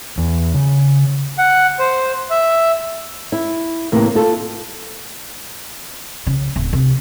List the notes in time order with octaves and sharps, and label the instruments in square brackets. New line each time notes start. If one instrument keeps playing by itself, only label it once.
[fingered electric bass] E2
C#3
[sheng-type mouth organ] F#5
C5
E5
[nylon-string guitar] E4
A2 C3 E3 A#3
F4 A4
[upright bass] C#3
D1
C3